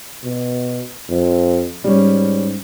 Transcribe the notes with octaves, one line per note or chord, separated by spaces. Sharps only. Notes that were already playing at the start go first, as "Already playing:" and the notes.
B2
F2
G#2 G3 C#4